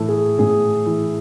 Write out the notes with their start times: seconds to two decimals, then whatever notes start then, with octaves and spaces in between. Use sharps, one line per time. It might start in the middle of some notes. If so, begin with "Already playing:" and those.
Already playing: A2 E3 A4
0.08 G#4
0.39 A2 G#4
0.86 E3